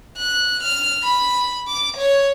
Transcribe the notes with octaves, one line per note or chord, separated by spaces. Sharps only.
F#6
F6
B5
D6
C#5